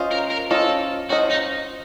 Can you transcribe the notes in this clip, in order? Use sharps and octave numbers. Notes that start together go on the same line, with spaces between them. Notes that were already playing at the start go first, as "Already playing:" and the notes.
Already playing: C#4 F4 C5 D#5
A#4
A#4
C#4 F4 A4 C5 D#5
C#4 F4 F#4 C5 D#5
D#4